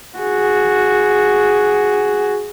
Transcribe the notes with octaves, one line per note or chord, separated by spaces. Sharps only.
F#4 G#4